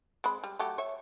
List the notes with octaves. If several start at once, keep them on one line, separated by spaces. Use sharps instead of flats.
G#3 C4 B5
G3
F#3 A3 G4
C#5 E5